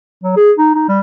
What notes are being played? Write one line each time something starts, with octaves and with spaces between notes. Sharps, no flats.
F#3
G#4
D#4
D#4
G3